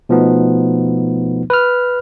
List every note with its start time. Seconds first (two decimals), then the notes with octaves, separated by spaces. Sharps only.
0.09 B2 F3 A3 B3 D#4
1.50 B4 F6